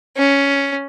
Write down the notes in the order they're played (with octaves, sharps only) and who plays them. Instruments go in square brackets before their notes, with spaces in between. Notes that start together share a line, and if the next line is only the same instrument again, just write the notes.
[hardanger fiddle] C#4